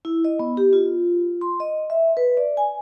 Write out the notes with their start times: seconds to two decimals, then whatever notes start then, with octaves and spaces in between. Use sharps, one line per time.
0.05 E4
0.25 D#5
0.39 B3
0.57 G4
0.73 F4
1.41 C6
1.60 D#5
1.90 E5
2.17 B4
2.37 D5
2.57 G#5